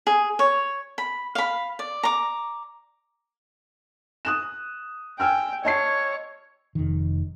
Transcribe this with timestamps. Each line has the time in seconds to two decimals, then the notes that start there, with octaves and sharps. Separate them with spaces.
0.07 G#4
0.39 C#5
0.98 B5
1.35 F5 B5
1.79 D5
2.03 A#5 D6
4.25 D#6 F#6 E7
5.20 G5 G#5 E6 F6
5.65 C#5 D#5 A5 C7
6.75 F1 D#3